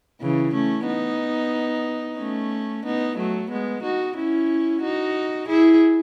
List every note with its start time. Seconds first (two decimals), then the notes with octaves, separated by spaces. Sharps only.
0.21 C#3 E3
0.54 A3 C#4
0.87 B3 D#4
2.18 A3 C#4
2.85 B3 D#4
3.17 F#3 A3
3.50 G#3 B3
3.83 D#4 F#4
4.16 C#4 E4
4.82 D#4 F#4
5.48 E4 G#4